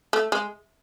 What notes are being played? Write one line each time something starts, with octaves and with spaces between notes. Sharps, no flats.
A3
G#3